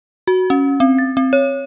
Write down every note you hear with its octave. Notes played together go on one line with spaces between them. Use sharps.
F#4
C#4
C4
A6
C4
C#5